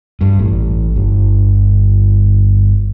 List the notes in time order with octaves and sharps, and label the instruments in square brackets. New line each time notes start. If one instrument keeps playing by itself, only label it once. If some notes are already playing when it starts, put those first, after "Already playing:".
[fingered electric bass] G2
A1
G1